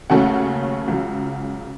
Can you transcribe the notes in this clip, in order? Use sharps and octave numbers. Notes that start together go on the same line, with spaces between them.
D#2 C#3 F#3 A3 C#4 F#5
C#2 C#3 F#3